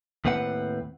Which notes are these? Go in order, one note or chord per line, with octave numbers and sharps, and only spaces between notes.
D#2 A2 C4 B4 F#5